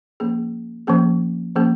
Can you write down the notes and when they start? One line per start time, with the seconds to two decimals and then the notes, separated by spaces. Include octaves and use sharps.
0.20 F3 A#3 C#4 G#4
0.87 F3 A#3 C#4 G#4
1.55 F3 A#3 C#4 G#4